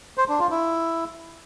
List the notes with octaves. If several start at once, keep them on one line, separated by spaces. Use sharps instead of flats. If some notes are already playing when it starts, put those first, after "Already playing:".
C5
D4
F4
E4